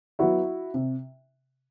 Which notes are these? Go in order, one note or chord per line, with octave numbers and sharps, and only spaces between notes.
F#3 B3 E4 F#4
C3